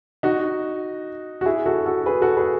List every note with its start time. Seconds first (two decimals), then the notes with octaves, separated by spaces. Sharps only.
0.23 D#4 F#4
1.41 F#4
1.46 E4 G#4
1.66 F#4 A4
1.86 F#4 A4
2.06 G#4 B4
2.22 F#4 A4
2.37 G#4 B4